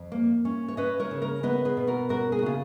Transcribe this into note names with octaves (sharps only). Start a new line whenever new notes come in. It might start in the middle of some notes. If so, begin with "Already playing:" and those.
Already playing: F2
A#3
C#4
C#5
C#4 B4 D#5
A#4 C#5
C#3
A#4 C#5
B3 B4 D#5
G#4 B4
B2
F#4 A#4
C#4 F#4 A#4
G#4
F#4
C#3 F4 G#4